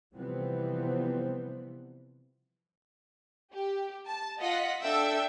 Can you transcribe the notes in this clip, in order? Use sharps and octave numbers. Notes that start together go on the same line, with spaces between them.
C3 E3 F3 G3 B3 C4
G4
A5
F4 D#5 F#5 B6
D4 A4 E5 G5 E6